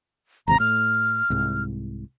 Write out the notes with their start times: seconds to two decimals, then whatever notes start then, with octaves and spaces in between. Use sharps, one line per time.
0.48 G#1 E2 C3 A#5
0.60 A2 F6
1.30 C2 G#2